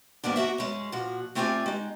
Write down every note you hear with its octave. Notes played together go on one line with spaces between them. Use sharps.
D#2 G#2 A#3 B3 D4
A#3 B3 F#4 E5
F#2 G#3 C#4
A#2 F3 F#4
A3 C4 F4 G4 D5 G#5
G#3 D#4